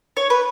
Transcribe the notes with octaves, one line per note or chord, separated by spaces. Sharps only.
C#5
B4